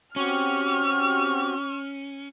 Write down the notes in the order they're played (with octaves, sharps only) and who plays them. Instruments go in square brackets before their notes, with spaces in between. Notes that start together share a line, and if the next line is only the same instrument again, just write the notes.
[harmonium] C4 F#4 G4 [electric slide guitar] C#4 [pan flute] C#6 [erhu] F6